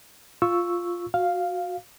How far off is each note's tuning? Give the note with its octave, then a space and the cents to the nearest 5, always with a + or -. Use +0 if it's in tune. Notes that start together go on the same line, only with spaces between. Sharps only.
F4 +0 C#6 +0 E6 +0
F#4 -15 F5 +0